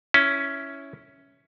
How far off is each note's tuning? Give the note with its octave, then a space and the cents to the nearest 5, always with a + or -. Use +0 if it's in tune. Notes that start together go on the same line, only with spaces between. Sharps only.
C#4 +5 E4 +0